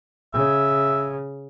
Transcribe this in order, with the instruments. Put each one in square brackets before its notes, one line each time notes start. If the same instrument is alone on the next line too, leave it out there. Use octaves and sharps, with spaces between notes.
[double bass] C#3 [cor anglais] E5